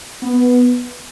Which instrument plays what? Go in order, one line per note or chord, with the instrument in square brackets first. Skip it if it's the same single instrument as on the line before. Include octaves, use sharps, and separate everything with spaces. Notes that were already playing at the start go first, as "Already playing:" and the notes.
[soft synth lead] B3